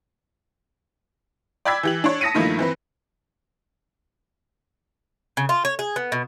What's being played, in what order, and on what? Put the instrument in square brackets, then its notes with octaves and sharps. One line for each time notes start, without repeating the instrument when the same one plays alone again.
[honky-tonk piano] D5 G5 B5 E6 G#6 B6
E3 G4 F#7
D4 C#5
A5 D#6 A#6 B6 C#7 D#7
G2 D#3 F3 A3 A#3 E4
E3 C4 B4
[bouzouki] C#3
F4
C#5
G#4
B3
B2